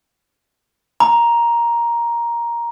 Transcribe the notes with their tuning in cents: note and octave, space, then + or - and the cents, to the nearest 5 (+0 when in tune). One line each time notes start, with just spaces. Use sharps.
A#5 +10